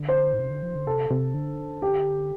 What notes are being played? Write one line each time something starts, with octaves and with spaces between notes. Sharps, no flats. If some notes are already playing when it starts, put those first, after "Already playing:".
Already playing: D3
C5
A2
C3
D3
F3
D3
C3 A4
C3
D3
G4